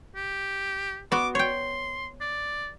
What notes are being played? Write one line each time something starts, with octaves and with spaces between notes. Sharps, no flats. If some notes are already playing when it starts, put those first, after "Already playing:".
G4
B3 F#4 D6
C#5 G5 C6
D5